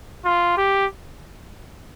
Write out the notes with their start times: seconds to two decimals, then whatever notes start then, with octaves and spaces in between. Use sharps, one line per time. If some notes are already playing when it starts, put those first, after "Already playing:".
0.25 F4
0.57 G4